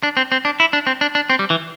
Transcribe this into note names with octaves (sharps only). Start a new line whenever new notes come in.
D4
C4
C4
D4
E4
D4
C4
D4
D4
C4
G3
E3